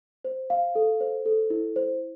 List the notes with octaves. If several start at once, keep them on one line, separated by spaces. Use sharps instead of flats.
C5
F5
A4
C5
A4
E4
C5